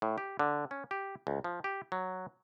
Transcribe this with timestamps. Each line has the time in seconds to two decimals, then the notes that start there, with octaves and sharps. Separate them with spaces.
0.02 A2
0.18 G4
0.39 D3
0.71 C#4
0.91 G4
1.27 C#2
1.44 F3
1.64 G4
1.92 F#3